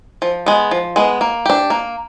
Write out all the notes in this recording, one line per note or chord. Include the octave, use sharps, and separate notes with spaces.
F3
G#3 B3
F3
G#3 B3
A#3
D4 G4
A#3